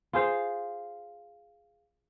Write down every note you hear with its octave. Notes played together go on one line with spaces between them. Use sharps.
F4 G#4 C5 F5